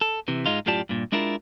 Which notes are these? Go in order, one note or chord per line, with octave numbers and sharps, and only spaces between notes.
A4
C3 E3
G#2 G#3 D#4 F4
F#2 A2 F4 G4 D5 A5
G2 A#2
G#3 D4 E4 F4 A#4